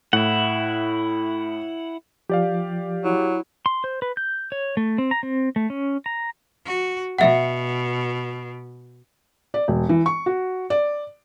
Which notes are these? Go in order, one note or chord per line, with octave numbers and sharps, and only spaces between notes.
A2 E4 F#5
F3 G4 D5 F5
F#3 E4
C6
C5
B4
G6
C#5
A3
C4
A#5
C4
A3
C#4
A#5
F#4
B2 E5 F#5
D5
E1
E3
C#6
F#4
D5